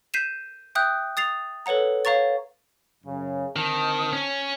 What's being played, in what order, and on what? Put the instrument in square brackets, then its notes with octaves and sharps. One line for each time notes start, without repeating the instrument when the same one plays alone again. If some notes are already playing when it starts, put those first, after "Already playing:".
[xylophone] G6 B6 C7 D#7 E7
E5 G5 D#6 F#6 G6
D#6 A6 C7 F7
A4 B4 C#5 F#5 A#5
C#5 F5 A#5 C#6 A6
[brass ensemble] F#2 C#3
[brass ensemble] D3 C4 A5 [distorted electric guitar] D#3
[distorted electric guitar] C#4